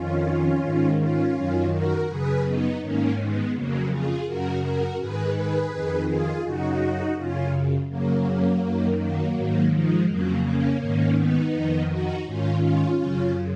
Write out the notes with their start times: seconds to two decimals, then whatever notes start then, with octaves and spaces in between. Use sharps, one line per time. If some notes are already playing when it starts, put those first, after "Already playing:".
Already playing: F2 D#3 C#4 F4
0.62 G#2 D#3
1.00 C#4 F4
1.36 F#2 D#3
1.72 F#4 A#4
2.08 F#2 C#3 G#4 B4
2.44 B3 D#4
2.80 G#2 D#3 A#3 C#4
3.17 G#3 B3
3.53 F2 C#3 F#3 A#3
3.90 F4 G#4
4.26 F#2 C#3 F#4 A#4
4.62 F#4 A#4
4.99 G#2 D#3 G#4 B4
5.36 G#4 B4
5.71 F2 D#3
6.07 F4 G#4
6.44 F#2 C#3 D#4 F#4
7.16 F#2 C#3 C#4 F4
7.89 F#2 C#3 F#3 A#3
8.62 F#2 D#3
8.98 F#3 A#3
9.35 G#2 D#3
9.71 F3 G#3
10.07 F2 C#3 F#3 A#3
10.43 A#3 C#4
10.80 G#2 D#3 A#3 C#4
11.16 B3 D#4
11.52 F2 D#3
11.89 D#4 F#4
12.25 G#2 D#3 C#4 F4
12.61 C#4 F4
12.98 F#2 C#3 C#4 F4